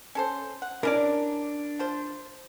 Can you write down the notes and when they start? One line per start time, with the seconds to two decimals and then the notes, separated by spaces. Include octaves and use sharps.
0.15 C#4 A4 C5
0.62 F#5
0.83 C#4 D4 E4 A#4 D5
1.79 F3 C5